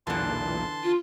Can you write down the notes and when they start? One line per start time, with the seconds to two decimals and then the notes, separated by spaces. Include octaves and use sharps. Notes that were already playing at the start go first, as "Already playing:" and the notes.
0.07 B1 E2 A#2 D3 E3 A5 C6
0.83 F4